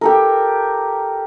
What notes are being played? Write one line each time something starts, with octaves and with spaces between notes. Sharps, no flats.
G4 A4 A#4